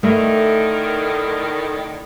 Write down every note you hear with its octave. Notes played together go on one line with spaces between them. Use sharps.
A2 D3 D#3 A3